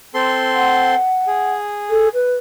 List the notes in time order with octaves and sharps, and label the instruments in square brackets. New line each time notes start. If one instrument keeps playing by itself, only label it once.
[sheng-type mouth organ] C4 A4 C6
[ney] F#5
[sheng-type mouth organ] G#4
[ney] A4
B4